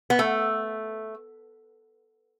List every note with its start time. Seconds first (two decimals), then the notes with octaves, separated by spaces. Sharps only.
0.10 B3
0.19 A3